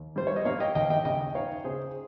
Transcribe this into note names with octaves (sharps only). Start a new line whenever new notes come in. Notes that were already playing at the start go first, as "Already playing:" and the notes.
Already playing: D#2
G3 C5
C#5
D#5
A#3 C#5 F5
D#5 G5
D#2 D#5 G5
D#5 G5
C#3 D#5 G5
D#4 C#5 F5
C#3 G#4 C5